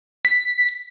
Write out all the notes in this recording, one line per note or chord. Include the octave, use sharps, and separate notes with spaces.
B6